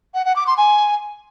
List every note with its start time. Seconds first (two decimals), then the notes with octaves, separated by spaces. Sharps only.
0.14 F#5
0.25 F#5
0.36 D6
0.47 C6
0.58 G#5